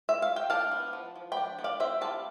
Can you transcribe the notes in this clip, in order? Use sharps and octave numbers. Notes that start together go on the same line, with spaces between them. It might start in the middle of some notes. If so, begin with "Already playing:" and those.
E5
F5
G5
D4 F5 A5
B3
F3
F3
G5 B5
D4
B3
D5 F5
C4 C5 E5
G3 F5 A5